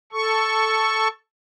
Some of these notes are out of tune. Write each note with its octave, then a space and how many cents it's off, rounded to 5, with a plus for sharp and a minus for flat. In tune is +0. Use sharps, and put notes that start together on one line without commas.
A4 +0 C#6 +0